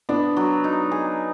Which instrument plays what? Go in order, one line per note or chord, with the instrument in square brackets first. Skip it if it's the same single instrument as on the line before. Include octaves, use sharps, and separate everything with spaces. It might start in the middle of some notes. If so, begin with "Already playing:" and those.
[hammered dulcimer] B3 [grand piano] D4
[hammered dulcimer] F#3
D#4
G#4